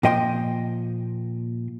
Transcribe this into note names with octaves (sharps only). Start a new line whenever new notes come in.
A#2 F3 D#5 G5 C6